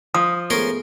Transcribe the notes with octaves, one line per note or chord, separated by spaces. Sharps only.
F3 D#6
G#3 A3 B3 C#4 A#4 C6